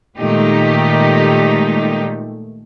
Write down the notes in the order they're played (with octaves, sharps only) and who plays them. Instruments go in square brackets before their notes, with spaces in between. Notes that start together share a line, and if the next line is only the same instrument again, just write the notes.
[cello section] A#2 D#3 G#3 A3 D#4 G4